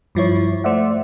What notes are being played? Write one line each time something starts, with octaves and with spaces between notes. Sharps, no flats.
G2 F3 E4 C#5
A3 C5 D5 E5 F#5